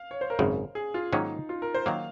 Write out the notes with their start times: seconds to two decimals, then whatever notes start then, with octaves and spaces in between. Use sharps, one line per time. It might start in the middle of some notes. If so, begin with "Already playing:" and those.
Already playing: F5
0.11 C#5
0.21 C5
0.30 A#4
0.39 G#1 F#2 C#3
0.75 G#4
0.94 F4
1.13 G#2 D#3 F#3 A#3 C#4 D#4
1.49 F4
1.62 A#4
1.74 C5
1.86 D#3 F#3 A#3 F5